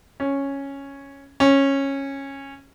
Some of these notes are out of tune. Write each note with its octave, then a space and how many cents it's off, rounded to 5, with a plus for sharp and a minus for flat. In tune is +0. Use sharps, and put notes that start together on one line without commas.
C#4 -5
C#4 -15